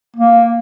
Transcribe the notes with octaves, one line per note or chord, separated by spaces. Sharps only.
A#3